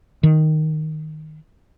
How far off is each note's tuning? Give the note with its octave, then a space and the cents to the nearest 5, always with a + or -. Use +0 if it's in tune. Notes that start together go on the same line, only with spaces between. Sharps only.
D#3 -5